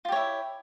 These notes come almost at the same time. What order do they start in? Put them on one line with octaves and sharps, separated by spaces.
F4 G4 C#5 E4